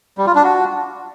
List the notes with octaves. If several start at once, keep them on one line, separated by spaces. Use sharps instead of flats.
G3
F4
D4
F#4